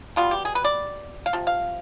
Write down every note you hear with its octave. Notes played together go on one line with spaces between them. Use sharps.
B2 G3 B3 F4
G4
G#4
B4
D5
F5
C3 F3
F5